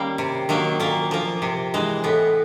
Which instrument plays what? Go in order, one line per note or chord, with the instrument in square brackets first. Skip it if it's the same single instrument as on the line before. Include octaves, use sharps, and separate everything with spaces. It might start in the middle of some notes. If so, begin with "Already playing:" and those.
Already playing: [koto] D#3 G3 A#3 C#4
C3
D#3 F#3 A#3
A#2 A#3
F3 A#3
C3
E3 G#3
A2 B3